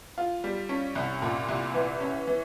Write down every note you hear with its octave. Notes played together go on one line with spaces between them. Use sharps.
F4
G3
C#4
C2
A#2
C2
E3
C#4
E3